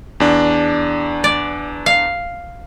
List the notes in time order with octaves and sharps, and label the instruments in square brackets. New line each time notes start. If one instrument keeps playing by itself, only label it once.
[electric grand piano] E2 D4
[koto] D5
F5